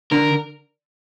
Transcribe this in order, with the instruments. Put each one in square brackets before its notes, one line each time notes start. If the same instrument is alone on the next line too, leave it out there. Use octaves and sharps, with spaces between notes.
[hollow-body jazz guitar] D3 [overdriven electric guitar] A#4